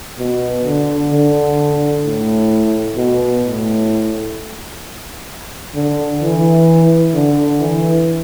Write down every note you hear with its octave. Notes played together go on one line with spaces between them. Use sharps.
B2
D3
D3
A2
B2
A2
D3
E3
D3
E3